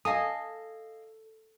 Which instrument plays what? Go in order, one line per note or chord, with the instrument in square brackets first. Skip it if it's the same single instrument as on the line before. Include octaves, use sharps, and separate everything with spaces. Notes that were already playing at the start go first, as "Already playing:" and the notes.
[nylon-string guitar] A4 [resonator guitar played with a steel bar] D#5 F5 G#5 [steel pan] D#6